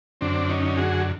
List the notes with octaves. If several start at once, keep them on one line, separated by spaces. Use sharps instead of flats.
F#2 D3 C4 D4
C#4 D#4
F#4 G#4